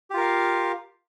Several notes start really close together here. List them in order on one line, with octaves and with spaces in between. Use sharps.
G4 F4 A#4 F5